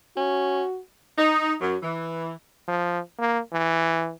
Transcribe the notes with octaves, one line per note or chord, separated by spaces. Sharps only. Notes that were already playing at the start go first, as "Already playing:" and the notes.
C#4 F#4
D#4
F#2
E3
F3
A#3
E3